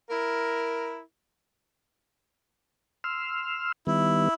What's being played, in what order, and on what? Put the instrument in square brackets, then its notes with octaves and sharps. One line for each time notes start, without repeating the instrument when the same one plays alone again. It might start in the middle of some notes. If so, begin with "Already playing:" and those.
[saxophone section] E4 A#4
[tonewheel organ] C6 E6 F6
[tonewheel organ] D#3 G3 B3 [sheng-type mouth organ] E4